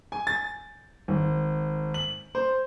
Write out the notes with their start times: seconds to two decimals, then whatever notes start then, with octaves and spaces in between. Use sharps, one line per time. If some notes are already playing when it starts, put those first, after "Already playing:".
0.12 G#5
0.27 A6
1.08 G#1
1.94 F#7
2.35 C5